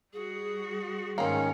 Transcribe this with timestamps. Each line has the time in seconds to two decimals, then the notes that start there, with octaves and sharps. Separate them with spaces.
0.13 G3 F#4 G#4
1.18 G#2 D#3 A#3 C4 C#4 C#5